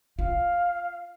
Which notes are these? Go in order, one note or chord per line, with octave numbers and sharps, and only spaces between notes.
F4 F5